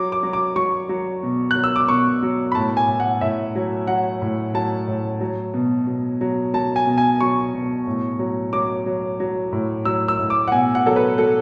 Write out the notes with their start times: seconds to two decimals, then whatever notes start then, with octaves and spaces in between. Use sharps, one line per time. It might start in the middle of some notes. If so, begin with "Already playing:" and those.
Already playing: F#3 D6
0.12 D6
0.23 F#3
0.33 D6
0.56 F#3 C#6
0.89 F#3
1.23 B2
1.51 F#3 F#6
1.64 E6
1.76 D6
1.89 B2 C#6
2.22 F#3
2.52 B5
2.55 A2 A5
2.77 G#5
2.88 A2
3.00 F#5
3.21 A2 E5
3.55 F#3
3.87 F#3 F#5
4.22 A2
4.54 F#3 A5
4.87 A2
5.21 F#3
5.54 B2
5.87 B2
6.21 F#3
6.54 F#3 A5
6.76 G#5
6.87 B2
6.98 G#5
7.21 F#3 C#6
7.54 B2
7.87 A2
8.19 F#3
8.53 F#3 D6
8.86 F#3
9.20 F#3
9.52 A2
9.85 F#3 E6
10.08 E6
10.19 A2
10.30 D6
10.48 F#5
10.52 B2 G#5
10.75 F#5
10.86 F#3 A4
10.96 B4
11.18 F#3 A4